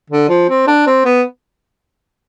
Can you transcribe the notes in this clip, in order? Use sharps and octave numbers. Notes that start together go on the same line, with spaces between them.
D3
F3
C4
D4
C4
B3